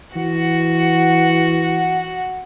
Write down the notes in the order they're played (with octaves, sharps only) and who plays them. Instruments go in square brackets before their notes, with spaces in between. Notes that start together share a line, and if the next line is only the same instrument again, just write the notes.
[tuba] E3 [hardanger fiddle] F#4 F#5